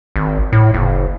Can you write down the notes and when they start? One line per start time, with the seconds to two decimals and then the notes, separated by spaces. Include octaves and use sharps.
0.16 G#1
0.52 A2
0.74 F#1